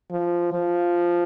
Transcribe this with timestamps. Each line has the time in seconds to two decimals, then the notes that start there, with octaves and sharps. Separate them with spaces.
0.11 F3
0.52 F3